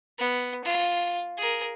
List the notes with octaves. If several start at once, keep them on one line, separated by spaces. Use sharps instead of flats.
B3
F4
G#4 A#4